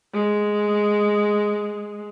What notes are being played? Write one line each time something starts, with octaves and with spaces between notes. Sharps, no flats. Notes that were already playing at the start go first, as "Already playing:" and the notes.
G#3